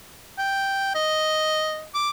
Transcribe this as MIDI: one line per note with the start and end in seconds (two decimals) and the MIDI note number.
0.38 0.95 79
0.95 1.86 75
1.94 2.10 86